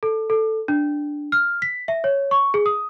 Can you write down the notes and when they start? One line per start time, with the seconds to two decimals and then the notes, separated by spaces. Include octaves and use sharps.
0.03 A4
0.30 A4
0.68 D4
1.32 F6
1.62 B6
1.88 E5
2.04 C#5
2.31 C#6
2.54 G#4
2.66 D#6